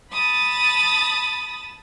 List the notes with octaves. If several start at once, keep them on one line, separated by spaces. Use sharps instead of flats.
A5 B5 D#6 A6